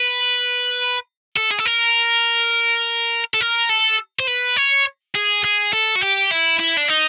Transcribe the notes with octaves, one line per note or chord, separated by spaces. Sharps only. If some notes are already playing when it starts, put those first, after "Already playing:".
Already playing: B4
A4
G#4
A4
A#4
A4
A#4
A4
C5
B4
C#5
G#4
G#4
A4
F#4
G4
E4
E4
D4
D#4